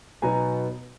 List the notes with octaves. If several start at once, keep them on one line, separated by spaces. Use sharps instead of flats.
B2 F#3 B3 D#4 G#5 A#5